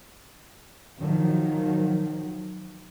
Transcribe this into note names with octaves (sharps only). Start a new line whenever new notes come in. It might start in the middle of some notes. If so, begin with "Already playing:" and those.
D#3 F3 F#3